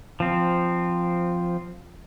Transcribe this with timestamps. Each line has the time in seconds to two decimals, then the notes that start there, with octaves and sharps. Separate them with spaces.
0.20 F3 C4